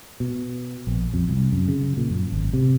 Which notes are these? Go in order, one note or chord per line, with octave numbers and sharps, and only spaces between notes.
B2
A#1
F2
C2
F#2
C#3
A#2
F#2
G#1
C3